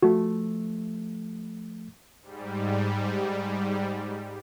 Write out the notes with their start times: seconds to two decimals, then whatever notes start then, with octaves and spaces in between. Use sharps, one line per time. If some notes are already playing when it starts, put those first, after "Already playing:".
0.03 F3 A3 F#4
2.22 G#2 G3